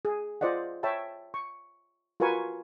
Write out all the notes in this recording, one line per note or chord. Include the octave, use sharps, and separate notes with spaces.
G#4
F4 C5 D5 D#5 F#5
C#5 E5 G5 A5 B5
C#6
F4 F#4 A#4 B4 G#5 C#6